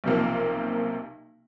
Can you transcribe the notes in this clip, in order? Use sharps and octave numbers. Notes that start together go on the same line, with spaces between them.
B1 C3 F3 A#3